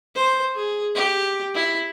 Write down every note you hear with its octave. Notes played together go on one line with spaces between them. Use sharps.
C5
G#4
G4
E4